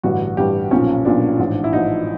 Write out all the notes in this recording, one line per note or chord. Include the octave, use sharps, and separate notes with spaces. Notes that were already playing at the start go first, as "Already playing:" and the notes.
A1 G2 D3 G3 F#4
A1 G2 D3 G3 G4
B1 A#2 F3 C#4
B1 A#2 F3 D4
A1 G#2 F3
E4
A1 G#2 F3 D#4